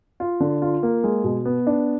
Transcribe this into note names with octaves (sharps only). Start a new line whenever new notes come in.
F4
D3
F4
A#3
G#3
B2
B3
D4